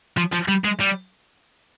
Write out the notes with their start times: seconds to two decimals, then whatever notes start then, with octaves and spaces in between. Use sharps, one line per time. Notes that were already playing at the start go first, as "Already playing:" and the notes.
0.17 F3
0.33 F3
0.48 G3
0.64 G#3
0.80 G3